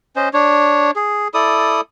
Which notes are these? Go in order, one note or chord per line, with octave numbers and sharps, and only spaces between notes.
C#4 C5 D#5
D4 C#5
G#4
E4 A4 D5 D#6